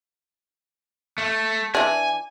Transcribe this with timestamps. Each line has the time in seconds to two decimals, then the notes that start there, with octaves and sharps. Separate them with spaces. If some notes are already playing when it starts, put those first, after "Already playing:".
1.18 A3
1.75 E3 D4 G#5